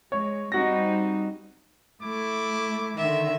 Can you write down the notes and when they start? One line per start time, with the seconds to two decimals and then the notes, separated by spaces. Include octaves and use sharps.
0.12 G#3 C#5
0.52 G3 C4 D#4 F#4 A#6
2.03 A3 E4 D6
2.97 D3 D#3 E5